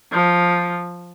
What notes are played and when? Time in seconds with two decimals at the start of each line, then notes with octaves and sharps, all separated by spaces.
0.12 F3